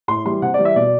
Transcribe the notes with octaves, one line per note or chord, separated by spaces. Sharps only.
A2 C6
E3 G3 C6
C3 F#5
D5
E3 G3
E5
B2 D5